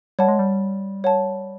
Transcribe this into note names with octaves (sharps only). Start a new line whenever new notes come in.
G3 C#5 F#5 A5
G#3
G3
C#5 F#5 A5